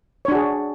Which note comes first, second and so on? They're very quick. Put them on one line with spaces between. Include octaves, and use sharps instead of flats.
C#5 D4 F#4 G#4